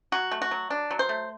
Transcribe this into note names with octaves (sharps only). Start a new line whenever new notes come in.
F#3 F#4
A3
F#4
F#3
D4
F#3
C5
A3